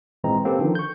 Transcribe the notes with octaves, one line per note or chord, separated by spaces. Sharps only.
G#1 A#2 E3 G#3 C4 A#5
A#3 C4 C#4 G4 A4 B4
D3 D#3 F3
C#6 G6